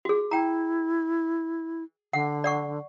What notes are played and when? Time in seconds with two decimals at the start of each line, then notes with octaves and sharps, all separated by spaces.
0.05 F#4 G#4
0.31 E4 G5 A#5
2.13 D3 F#5
2.44 D5 F#5 C#6